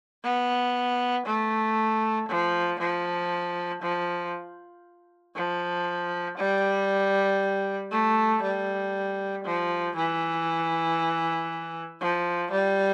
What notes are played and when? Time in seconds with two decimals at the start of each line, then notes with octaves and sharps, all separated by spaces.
0.24 B3
1.26 A3
2.29 F3
2.79 F3
3.82 F3
5.35 F3
6.37 G3
7.91 A3
8.43 G3
9.44 F3
9.96 E3
12.01 F3
12.52 G3